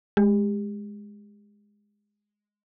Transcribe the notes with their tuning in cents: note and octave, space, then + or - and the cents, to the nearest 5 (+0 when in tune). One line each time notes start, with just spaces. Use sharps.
G#3 +0 G4 +30